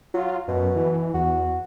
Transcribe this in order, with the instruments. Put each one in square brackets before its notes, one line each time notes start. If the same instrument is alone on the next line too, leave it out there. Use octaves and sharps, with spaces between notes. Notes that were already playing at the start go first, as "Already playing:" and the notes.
[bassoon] F#3 [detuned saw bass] F4
[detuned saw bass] F#2 [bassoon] B2
[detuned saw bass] E3
[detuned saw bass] E2 [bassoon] F#4